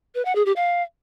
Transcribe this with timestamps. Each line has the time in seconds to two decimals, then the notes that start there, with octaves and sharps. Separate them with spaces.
0.15 B4
0.25 F#5
0.35 G#4
0.46 G4
0.56 F5